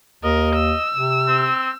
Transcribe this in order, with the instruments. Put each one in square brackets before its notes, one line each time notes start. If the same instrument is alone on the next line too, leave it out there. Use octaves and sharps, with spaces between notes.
[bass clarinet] D#2 [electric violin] A#4 [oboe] D#5
[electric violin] E6
[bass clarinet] C3
[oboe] C4